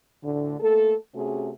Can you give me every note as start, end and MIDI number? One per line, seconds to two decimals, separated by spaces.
0.22 0.55 38
0.22 0.55 45
0.22 0.55 50
0.60 0.94 57
0.60 0.94 58
0.60 0.94 69
1.14 1.50 48
1.14 1.50 57
1.14 1.50 61
1.14 1.50 66
1.14 1.50 68